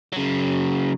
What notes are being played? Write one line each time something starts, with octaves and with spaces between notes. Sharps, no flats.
C#3 F#3